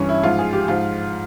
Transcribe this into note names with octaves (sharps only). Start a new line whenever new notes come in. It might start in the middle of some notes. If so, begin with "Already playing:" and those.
Already playing: G2 E3 C#4
E4
G#2 F3 F4
G#4
G4
G#2 F3 F4